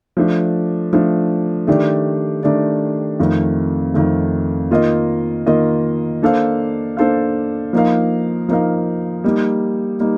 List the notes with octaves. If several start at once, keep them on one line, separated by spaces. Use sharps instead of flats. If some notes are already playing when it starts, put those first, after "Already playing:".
F3 A3 D4
F3 A3 D4
D#3 A3 D4 G4 D5
D#3 A3 D4 G4 D5
F2 D#3 A3
F2 D#3 A3
D#3 A#3 F4 A#4 D#5
D#3 A#3 F4 A#4 D#5
A#3 D4 A4 C5 F5
A#3 D4 A4 C5 F5
F3 A#3 D#4 A#4 F5
F3 A#3 D#4 A#4 F5
G3 A#3 D#4
G3 A#3 D#4